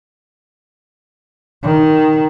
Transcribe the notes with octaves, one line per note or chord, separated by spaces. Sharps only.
D#3